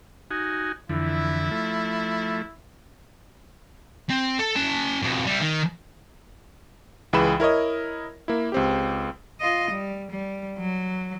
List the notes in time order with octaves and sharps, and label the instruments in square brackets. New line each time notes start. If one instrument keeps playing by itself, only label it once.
[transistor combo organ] D#4 F#4 G#5
[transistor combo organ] F2 D3 E3 [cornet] E4
[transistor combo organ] F3 A3
[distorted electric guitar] C4
A4
C#4 A5
F2 B2
G3 E4
D#3
[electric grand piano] C#2 E3 G#4 B5 E7
E4 A#4 C#5 D#5
A#3 E4
C#2 C4 G4
[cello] F4 D#5
G3
G3
F#3